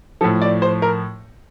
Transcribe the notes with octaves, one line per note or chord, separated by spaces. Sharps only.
A2 F3 A4
D5
C5
A#4